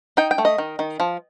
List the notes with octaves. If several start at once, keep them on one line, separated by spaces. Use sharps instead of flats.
D#4 G5
G5
A3
D#5
D#3
D#3
F3